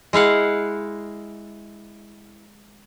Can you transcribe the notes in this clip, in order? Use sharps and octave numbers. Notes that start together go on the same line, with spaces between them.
G#3 E4 F5 F#5